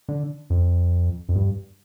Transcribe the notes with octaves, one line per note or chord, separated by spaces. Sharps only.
D3
F2
F2
G2